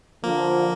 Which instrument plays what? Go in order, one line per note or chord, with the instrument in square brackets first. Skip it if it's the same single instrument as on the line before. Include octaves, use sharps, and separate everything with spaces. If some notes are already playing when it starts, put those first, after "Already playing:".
[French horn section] D3 F3 [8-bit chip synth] A#3